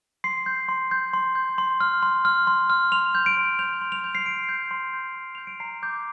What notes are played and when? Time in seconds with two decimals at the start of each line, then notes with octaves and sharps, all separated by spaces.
0.24 C6 C7
0.46 G6
0.69 C6
0.91 G6
1.14 C6
1.35 G6
1.58 C6
1.80 F6
2.03 C6
2.25 F6
2.47 C6
2.70 F6
2.92 C6 F7
3.15 G6
3.26 D7
3.37 C6
3.59 G6 F7
3.82 C6
3.92 F7
4.04 G6
4.15 C7
4.26 C6 D7
4.49 G6
4.71 C6
4.93 G6
5.16 C6
5.35 G6 F7
5.47 D7
5.60 A#5 C7
5.83 D6 G6